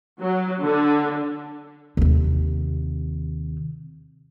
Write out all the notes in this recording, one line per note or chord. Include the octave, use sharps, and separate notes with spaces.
F#3
D3
D#2 C3